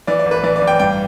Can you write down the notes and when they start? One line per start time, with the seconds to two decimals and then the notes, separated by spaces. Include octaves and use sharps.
0.07 E3 D5
0.19 D5
0.26 A1
0.31 B4
0.43 E3 D5
0.56 D5
0.62 A1
0.67 G5
0.79 G2 G5